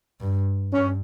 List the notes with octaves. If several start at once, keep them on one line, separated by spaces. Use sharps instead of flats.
G2
G2 C#4